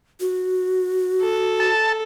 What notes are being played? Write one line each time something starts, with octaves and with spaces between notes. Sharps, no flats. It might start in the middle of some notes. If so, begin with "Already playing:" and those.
F#4
A4
A5